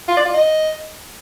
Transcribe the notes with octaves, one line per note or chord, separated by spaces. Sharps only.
F4
D5
F4
D#5